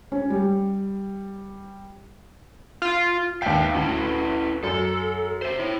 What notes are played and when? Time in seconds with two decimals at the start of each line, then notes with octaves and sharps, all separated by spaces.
0.12 C#4
0.30 G3
2.82 F4
3.42 D#2 B4 E5 F5 G5
3.75 D2 C#4 E4 B4
4.63 F#2 A4
5.42 C5 E5
5.59 E4 C#5